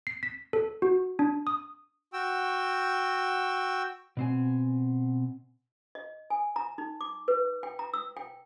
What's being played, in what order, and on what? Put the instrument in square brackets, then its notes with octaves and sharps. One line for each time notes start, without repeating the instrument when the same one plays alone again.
[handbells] C7
B6
A4
F#4
D4
D#6
[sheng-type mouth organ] F#4 G5 E6
[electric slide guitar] B2 C4 G#5
[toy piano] D#5
G#5
A#5
D#4
D6
B4
G5
A#5
E6
G5